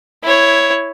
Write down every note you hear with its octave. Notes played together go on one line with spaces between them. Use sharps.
E4 C#5